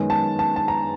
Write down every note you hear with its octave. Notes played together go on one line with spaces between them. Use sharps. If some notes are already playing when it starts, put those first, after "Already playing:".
Already playing: F#2 D#3 G#3 B3
A5
A5
A5
A#5